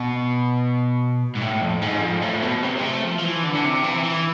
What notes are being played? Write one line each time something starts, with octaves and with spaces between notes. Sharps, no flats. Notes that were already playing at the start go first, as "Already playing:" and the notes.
Already playing: B2
G#2
A2
F2
G#2
F2
A2
B2
C3
G#3
A3
F3
F3
E3
D3
D3
C3
E3
E3